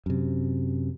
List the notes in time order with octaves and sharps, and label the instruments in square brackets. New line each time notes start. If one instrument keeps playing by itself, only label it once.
[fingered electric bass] F#2 C3